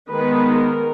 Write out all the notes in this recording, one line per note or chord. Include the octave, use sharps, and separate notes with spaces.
D#3 G#3 B3 B4
A#4